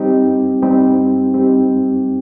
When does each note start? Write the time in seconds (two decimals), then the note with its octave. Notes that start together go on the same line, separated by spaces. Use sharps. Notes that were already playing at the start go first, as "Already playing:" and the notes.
Already playing: G3 C4 D#4 G4
0.62 G3 C4 D#4 G4
1.34 G3 C4 D#4 G4